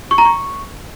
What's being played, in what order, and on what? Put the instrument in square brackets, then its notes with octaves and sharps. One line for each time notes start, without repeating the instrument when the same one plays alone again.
[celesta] C#6
A#5
C#6